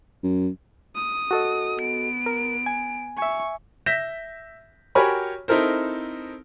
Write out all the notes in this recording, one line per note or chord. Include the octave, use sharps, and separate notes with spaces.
F#2
D#6
F#4 A4 D#5
B3 D7
A#4
G#5
E5 G#5 C#6
E5 G6 A#6 B6 E7
F#4 G4 A#4 C#5 G#5 B5
C4 D#4 E4 A4 A#4 C5